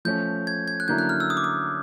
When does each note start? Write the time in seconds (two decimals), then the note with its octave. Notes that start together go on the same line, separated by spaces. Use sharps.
0.05 F3 A3 C#4 G6
0.47 G#6
0.68 G#6
0.80 F#6
0.88 D3 F#3 A#3 C#4 E4 G6
0.98 F#6
1.09 F6
1.20 E6
1.30 D#6
1.37 D6
1.44 D#6